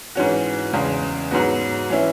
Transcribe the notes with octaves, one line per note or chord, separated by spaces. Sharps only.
G#2 E3 C#4 F#4
E2 C#3 G#3
G#2 F#3 B3 F#4
E3 C#4 E4